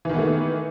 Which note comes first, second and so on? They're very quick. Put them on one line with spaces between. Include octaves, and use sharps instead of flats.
E3 D#3 B3 A3